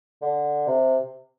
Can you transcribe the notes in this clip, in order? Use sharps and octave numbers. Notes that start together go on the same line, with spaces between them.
D3
C3